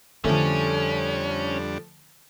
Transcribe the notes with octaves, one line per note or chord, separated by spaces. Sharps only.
F2 D3 F3 G3 A3 C#4 D4